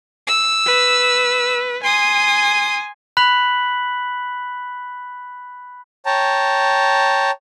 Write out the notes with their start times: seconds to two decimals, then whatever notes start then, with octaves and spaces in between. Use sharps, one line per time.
0.27 E6
0.66 B4
1.84 G#5 C6 D#6
3.17 B5 F#6 B6 F#7
6.06 C#5 G5 A5 A#5